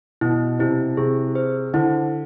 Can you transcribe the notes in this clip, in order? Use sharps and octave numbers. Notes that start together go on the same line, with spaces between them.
B2 E4
C3 E4
C3 G#4
C5
D3 E4